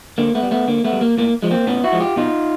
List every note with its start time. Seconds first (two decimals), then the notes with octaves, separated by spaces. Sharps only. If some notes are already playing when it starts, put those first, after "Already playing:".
0.18 D3 A#3
0.35 A3 B3
0.43 G3
0.51 A3 B3
0.68 D3 A#3
0.84 A3 B3
0.93 G3
1.01 A#3
1.18 A2 A#3
1.42 F3 G#3
1.51 A#3 C4
1.67 A2 B3 C#4
1.84 E4 F#4
1.92 F3 G#3
2.00 F4 G4
2.16 B2 D#4 F4